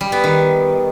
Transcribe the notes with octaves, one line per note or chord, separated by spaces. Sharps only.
G3
B3
D#3